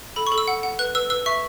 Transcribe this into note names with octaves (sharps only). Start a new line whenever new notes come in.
A4 B5
C#6
A4
E6
F#5
F#5
B4 F#6
B4 E6
B4 E6
E5 C#6